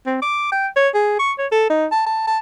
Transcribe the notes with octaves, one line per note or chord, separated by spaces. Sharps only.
C4
D6
G5
C#5
G#4
C#6
C#5
A4
D#4
A5
A5
A5